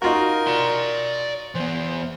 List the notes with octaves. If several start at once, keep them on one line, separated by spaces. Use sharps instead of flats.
D#4 F4 F#4 A#4
D5 C6
E3 B3 C5